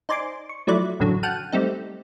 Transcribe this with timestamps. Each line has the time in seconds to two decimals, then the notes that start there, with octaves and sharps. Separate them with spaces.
0.09 D#4 C5 D5 G#5 C6 D6
0.49 C#6
0.67 F3 F#3 A3 E4 D5 F#6
1.00 A1 F#2 D3 F#3
1.23 F#5 G5 A5 F6 F#6 D#7
1.52 G3 A3 C4 D#4